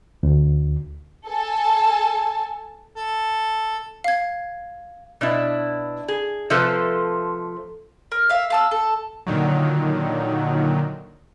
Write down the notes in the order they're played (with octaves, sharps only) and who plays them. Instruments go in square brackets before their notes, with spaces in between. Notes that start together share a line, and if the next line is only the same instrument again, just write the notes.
[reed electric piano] D2
[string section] A4 G#5 A5
[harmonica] A4
[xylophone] F5 G#6
[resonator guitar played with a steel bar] B2 D4 E4
G#4
C3 F3 A3 A4 B4 C5
[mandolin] A#4
E5 F5
F5 A5 E6
A4
[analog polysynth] A#2 D3 D#3 F#3